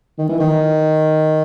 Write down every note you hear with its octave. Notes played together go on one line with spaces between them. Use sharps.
D#3
E3
D#3